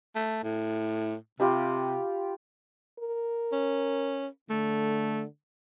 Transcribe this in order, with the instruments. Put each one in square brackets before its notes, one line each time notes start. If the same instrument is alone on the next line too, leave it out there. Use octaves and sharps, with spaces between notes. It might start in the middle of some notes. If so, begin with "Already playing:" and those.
[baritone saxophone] A3
A2
[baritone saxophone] C3 [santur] F4 G4 B5
[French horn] A#4
[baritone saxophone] C#4
[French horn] D3 [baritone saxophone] A3